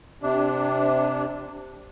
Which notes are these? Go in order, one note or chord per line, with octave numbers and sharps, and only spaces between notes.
C3 D4